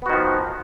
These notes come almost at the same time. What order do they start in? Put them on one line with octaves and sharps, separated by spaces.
B3 F#4 D#3 F3